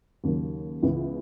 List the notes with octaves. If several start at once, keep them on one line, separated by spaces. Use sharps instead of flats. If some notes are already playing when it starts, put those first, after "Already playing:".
D#2 C#3 F#3 A#3
C#2 C#3 E3 B3